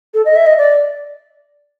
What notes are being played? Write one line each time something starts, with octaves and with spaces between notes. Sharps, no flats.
A4
D#5
E5
D#5
D5